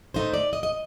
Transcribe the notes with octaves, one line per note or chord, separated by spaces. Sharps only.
D#3 A3 D#4 C5
D5
D#5
D#5